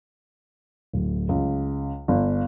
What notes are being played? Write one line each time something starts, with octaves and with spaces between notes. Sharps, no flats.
D1
C#2
G1